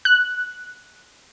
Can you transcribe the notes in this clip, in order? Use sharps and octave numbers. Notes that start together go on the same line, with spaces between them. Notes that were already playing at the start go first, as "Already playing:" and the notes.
F#6